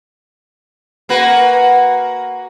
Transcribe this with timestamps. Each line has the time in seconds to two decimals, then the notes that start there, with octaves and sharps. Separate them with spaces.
1.09 A#3 F#4 B4